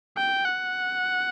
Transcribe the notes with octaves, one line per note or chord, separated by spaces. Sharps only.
G5
F#5